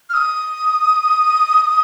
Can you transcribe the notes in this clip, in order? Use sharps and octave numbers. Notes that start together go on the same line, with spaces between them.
F6
D#6